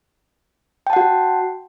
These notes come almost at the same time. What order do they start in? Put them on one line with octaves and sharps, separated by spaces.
G5 A5 F#5 F#4